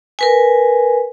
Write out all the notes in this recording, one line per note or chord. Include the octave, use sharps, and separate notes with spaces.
A#4 B4 G#5